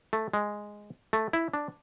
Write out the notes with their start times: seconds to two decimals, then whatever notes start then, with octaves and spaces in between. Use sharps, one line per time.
0.13 A3
0.34 G#3
1.13 A3
1.33 E4
1.54 D4